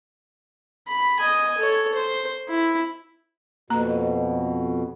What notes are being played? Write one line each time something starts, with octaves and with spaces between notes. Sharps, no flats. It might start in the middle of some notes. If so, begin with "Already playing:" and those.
B5
D#5 G#5
A4 C#5
C5
E4
F2 B2 A#3 A#5